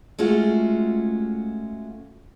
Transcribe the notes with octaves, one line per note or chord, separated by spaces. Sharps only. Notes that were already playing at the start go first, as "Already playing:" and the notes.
G#3 A3 C#4 F4 F#4